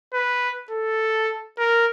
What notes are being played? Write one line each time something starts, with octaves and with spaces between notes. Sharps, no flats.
B4
A4
A#4